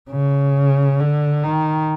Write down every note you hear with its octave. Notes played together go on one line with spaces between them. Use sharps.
C#3
D3
D#3